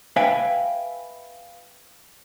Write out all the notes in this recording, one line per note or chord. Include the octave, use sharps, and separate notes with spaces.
B4 E5 F5 G5 G#5